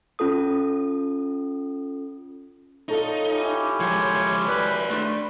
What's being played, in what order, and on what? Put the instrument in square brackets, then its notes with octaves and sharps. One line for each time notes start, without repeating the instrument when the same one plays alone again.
[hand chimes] C#4 F4 A4 D#6
[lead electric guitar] D#4 [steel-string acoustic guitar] F4 A4 C#5
[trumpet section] C#4 E4 G4
[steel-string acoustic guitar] D#2 [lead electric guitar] F3 G#3 [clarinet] C#5
[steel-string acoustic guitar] D#2 [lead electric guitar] F#4 D5 [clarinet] B4
[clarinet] A3 [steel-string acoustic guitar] C4 D4 B4